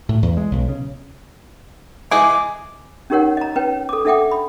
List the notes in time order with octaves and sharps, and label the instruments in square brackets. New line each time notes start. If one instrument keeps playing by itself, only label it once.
[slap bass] A2
E2
G#3
B1
C#3
[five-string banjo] E3 G#3 G#4 [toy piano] G#5 [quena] D6
[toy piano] C#4 D#4 G4 A#4 C#5 F#5
D#5 A#5
C#4 B4 C#5 G5
A4 D6
D4 A4 E5 F#5 G5 D6
B5